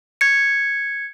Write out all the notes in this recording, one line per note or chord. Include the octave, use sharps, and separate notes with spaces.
G#6 C#7